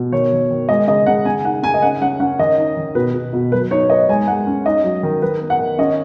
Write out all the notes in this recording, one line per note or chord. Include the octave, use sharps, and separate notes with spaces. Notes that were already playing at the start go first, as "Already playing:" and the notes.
Already playing: B2
D#3 C#5
D#3
D#3
G#3 D#5
C#3 D#5
C#3 F#5
C#3 G#5
D#4 F#5
C#3 G#5
D#5
C#4 F#5
C#4 F#5
C#4 F#5
D#3 D#5
D#4
D#3
B2 B4
B2
B2
F#3 B4
D#4 C#5
B3 D#5
G#3 G#5
G#3 F#5
C#4
D#4 D#5
F#3
D#3
D#3 B4
B3
F#5
D#3
C#4 D#5